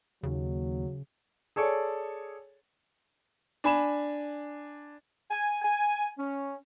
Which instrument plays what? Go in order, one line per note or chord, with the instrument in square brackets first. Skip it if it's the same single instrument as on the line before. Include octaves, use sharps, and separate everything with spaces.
[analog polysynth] D#2 [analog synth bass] C#3 [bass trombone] F#3
[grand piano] G#4 A4 C#5 D5
D4 G#5 B5 E7
[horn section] G#5
G#5
C#4